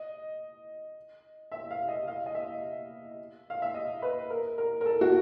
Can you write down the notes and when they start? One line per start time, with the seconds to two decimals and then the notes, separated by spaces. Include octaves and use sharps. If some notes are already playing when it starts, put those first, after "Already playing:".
Already playing: D#5
1.52 E5
1.71 F5
1.88 D#5
2.08 F5
2.26 D#5
2.35 E5
3.50 F5
3.62 E5
3.74 D#5
4.02 B4
4.30 A#4
4.58 A#4
4.81 A#4
4.85 A4
5.01 F#4